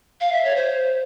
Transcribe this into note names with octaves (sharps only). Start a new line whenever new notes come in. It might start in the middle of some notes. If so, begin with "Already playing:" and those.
F5
E5
C#5
C5